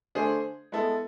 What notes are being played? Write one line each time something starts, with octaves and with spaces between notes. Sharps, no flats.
D3 A3 D4 G#4 C5
G#3 B3 E4 A4